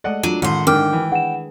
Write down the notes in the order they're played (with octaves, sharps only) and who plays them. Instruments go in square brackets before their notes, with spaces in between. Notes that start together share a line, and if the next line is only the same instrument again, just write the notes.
[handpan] G#3 A3 A4 [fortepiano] D5 D#5 F#5
[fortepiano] F#3 [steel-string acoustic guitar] D4 [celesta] F4 D#7
[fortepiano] A1 [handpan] D#3 G#3 [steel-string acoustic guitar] C5 F#5
[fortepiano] G#2 D3 [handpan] E4 [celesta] A#4 D6 F6 [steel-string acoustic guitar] G5
[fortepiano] E3
[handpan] D4 G#4 B4 [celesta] F#5 E7